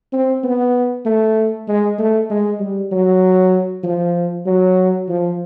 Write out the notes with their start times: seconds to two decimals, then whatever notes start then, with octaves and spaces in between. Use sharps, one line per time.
0.13 C4
0.44 B3
1.05 A3
1.68 G#3
1.99 A3
2.30 G#3
2.60 G3
2.92 F#3
3.84 F3
4.47 F#3
5.09 F3